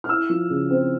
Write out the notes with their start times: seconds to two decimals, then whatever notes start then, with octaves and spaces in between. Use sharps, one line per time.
0.04 F6
0.09 E4 E6
0.29 F3
0.50 C#3
0.70 C4